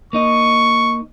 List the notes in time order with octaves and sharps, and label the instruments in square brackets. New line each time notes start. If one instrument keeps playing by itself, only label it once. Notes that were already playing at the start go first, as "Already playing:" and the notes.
[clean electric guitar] A#3 D#4 D#5 [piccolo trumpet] C#6